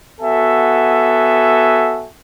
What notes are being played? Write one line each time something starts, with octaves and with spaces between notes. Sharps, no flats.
B3 F#4 A4 E5 G#5